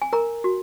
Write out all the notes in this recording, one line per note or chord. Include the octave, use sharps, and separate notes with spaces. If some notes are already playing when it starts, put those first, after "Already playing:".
G#5
A#4 A#5
F#4